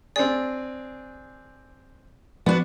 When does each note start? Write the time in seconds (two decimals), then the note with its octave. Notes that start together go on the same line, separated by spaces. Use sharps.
0.16 C4 D4 G#4 D5
2.46 F3 B3 D4 F#4